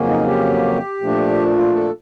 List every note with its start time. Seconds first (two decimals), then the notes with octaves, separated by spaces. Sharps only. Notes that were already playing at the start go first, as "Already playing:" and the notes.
Already playing: F2 C#3 F#3 A#3 C#4
0.08 D#4
0.27 G4
1.01 A#2 F3 A3 D4
1.56 F4
1.75 A4